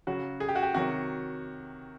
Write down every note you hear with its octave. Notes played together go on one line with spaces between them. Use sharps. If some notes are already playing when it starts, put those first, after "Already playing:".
C#3 F#3 F#4
G#4
G4
F#4
G4
C3 D#3 F#3 F#4